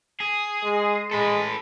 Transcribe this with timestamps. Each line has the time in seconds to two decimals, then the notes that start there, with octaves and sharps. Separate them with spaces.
0.20 G#4
0.64 G#3
1.11 G#3 A4 B4